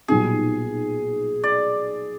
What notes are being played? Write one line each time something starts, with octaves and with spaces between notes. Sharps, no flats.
B1 A#2 G3 B3 D#4 G#4
D5